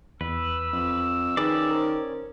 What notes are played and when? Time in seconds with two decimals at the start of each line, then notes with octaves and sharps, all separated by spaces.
0.21 E2 B4 E6
0.73 F2
1.37 D#3 C#4 G#4 B4 D5
1.71 A#4 C5